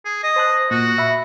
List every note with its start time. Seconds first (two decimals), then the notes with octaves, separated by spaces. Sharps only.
0.05 G#4
0.23 D#5
0.36 C5 A5 F#6
0.71 A#2 F#4
0.98 E5 B5